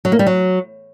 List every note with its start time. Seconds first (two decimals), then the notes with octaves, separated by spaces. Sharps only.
0.05 F#3
0.12 A#3
0.19 G3
0.27 F#3